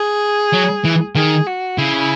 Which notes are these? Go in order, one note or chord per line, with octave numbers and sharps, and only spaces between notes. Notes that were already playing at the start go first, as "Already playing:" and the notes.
Already playing: G#4
F#3
E3
D#3 G#4
F#4
C#3 E4